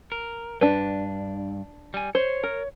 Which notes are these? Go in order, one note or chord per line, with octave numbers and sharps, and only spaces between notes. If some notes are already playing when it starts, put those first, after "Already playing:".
A#4
G2 D4 B4
G3 G#5
C5 C#5
A#4